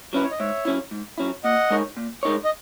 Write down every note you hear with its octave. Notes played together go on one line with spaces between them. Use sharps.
F#3 C#4 E4 B4
C#5
D#5
G#2 C#5 E5
F#3 C#4 E4
G#2
F#3 C#4 E4
A#2 D#5 F#5
G#3 D#4 A#4 C#5
A#2
G#3 D#4 A#4 C#5
D#5